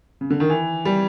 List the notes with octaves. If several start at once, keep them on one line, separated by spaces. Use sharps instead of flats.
C#3
D3
D#3
E3
G3